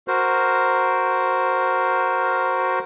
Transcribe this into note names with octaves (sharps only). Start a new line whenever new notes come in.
F#4 A#4 C5